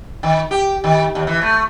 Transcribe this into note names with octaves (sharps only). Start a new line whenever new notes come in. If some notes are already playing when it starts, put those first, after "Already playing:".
D#3
G4
D#3
D#2
E3
A3